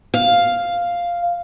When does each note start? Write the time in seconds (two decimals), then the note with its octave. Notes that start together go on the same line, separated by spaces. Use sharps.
0.14 F5